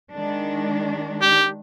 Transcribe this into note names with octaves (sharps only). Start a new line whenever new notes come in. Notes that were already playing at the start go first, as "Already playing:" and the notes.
D#3 G#3 D4
G4